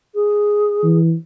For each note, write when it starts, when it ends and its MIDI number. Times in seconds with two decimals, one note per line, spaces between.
0.14 0.97 68
0.83 1.14 52